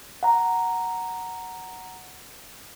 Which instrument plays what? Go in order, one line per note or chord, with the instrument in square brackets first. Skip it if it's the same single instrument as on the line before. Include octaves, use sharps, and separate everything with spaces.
[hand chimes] F#5 A#5